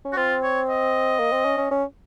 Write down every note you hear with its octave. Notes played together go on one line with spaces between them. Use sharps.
C#4
F#4
C4 F4
C#5
D#5
A#3
C4
C#4
C#4
C#4